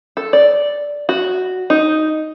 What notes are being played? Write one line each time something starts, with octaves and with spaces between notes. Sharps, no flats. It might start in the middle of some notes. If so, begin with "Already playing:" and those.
A4
D5
F#4
D#4